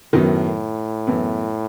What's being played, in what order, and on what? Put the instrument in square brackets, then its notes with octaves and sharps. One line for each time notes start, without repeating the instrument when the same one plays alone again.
[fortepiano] F#2 D#3 F#3 B3 [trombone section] A2
[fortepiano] F#2 E3 B3